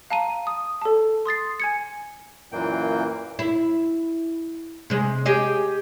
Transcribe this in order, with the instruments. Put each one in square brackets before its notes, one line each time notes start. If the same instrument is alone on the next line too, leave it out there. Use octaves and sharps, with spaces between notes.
[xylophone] F5 A5 A#5 D#7
D#6
A4 A5
C6 D#6 A6 C7
G#5 G#6 C#7
[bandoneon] F#2 A#2 E3 A#3 G5
[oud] E4
C3 G#3
G4 G#4 D#5